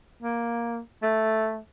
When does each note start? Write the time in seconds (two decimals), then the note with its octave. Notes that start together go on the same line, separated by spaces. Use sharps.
0.22 A#3
1.02 A3